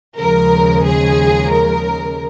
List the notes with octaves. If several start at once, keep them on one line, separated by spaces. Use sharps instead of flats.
D#2 C#3 F3 G#3 A#4
G#4
A#4